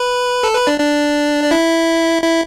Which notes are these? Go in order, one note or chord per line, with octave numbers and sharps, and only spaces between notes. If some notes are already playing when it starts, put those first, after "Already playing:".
Already playing: B4 B5
A4 A5
B4 B5
D4 D5
D4 D5
D5
E4 E5
E4 E5